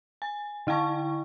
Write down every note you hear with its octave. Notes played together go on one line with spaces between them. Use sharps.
G#5
D3 E4 G5 A5 C#6